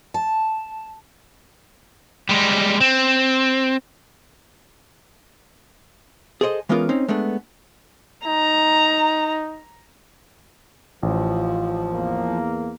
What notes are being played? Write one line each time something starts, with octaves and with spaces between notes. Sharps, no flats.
A5
G3 G#3
C4
G#4 A4 C5 D5 D#5
E3 G#3 B3 C#4 F4 A#4
C4 C#4 D#4
G#3 A3 B3 D4
D#4 A#5
A1 F3
E2 A#3